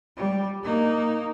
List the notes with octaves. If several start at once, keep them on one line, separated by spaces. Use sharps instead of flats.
G3
A#3 D#4